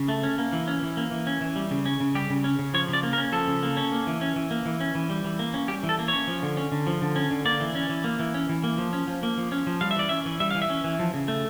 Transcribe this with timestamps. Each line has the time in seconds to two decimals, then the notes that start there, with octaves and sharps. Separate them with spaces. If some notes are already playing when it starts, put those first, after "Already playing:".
Already playing: C#3
0.08 A3
0.23 C#4
0.38 A#3
0.53 E3
0.68 C#4
0.82 E3
0.97 A#3
1.12 E3
1.27 C#4
1.41 E3
1.56 G3
1.71 C#3
1.86 C#4
2.00 C#3
2.15 G3 G4
2.30 C#3
2.44 C#4
2.59 C#3
2.74 F3 C#5
2.88 C#3
2.93 D5
3.03 A#3
3.13 A#4
3.18 C#4
3.33 F3 A4
3.48 C#3
3.63 A#3
3.77 C#4
3.92 A#3
4.07 E3
4.21 C#4
4.36 E3
4.51 A#3
4.66 E3
4.80 C#4
4.95 E3
5.10 G3
5.25 E3
5.39 A#3
5.54 C#4
5.68 G3 G4
5.83 E3
5.89 A4
5.99 A#3
6.08 C#4 C#5
6.27 F3
6.43 D3
6.57 C#4
6.72 D3
6.87 F3
7.02 D3
7.16 C#4
7.31 D3
7.45 A#3 D5
7.60 E3
7.75 C#4
7.90 E3
8.04 A#3
8.19 E3
8.34 C#4
8.49 E3
8.64 A#3
8.78 F3
8.93 C#4
9.07 F3
9.23 A#3
9.38 F3
9.52 C#4
9.67 F3
9.81 G3 F5
9.91 E5
9.96 E3 D5
10.09 C#4 E5
10.26 E3
10.40 G3 E5
10.51 E3 F5
10.62 E5
10.70 C#4
10.84 E3
10.99 F3
11.14 C#3
11.28 A3